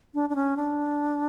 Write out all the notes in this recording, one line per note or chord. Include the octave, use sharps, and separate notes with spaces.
D4
D4
C#4
D4